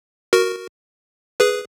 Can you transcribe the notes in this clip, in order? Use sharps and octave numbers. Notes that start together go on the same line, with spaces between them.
F#4 A#4
G#4 B4